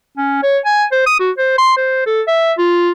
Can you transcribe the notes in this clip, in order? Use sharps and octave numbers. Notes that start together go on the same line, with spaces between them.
C#4
C#5
G#5
C5
D#6
F#4
C5
C6
C5
A4
E5
F4